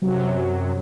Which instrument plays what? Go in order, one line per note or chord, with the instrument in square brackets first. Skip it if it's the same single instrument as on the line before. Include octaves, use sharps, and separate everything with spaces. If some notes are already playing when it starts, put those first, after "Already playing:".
[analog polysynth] F#2 C3 F#3